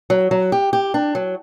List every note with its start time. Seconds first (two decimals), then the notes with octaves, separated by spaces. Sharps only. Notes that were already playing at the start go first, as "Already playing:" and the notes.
0.10 F#3
0.31 F#3
0.52 G4
0.73 G4
0.94 D4
1.15 F#3